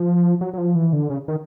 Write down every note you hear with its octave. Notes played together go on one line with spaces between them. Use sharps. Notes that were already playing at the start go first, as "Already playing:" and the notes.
Already playing: F3
F#3
F#3
F3
E3
D3
C#3
D#3